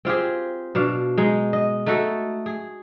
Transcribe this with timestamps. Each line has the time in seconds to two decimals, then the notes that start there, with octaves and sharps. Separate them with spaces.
0.05 C4 F4 G4 G#4
0.75 B2 D4 F5
1.18 G#3 D#4
1.53 D#5
1.86 A3 D#4 F#4 A4
2.46 G#4